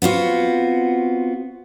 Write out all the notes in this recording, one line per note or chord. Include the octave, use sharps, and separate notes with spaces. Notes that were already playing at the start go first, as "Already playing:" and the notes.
B3 C4 F4 F#4